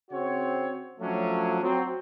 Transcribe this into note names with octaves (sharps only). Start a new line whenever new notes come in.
C#3 C4 F#4 C#5
F3 F#3 A3 C#4 D4
F#3 C4